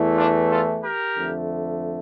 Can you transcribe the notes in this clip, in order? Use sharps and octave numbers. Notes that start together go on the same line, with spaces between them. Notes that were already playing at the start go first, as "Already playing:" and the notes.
Already playing: E2 E3 A3
D4 F4
F4 A4
G4 A#4
F2 D3 A3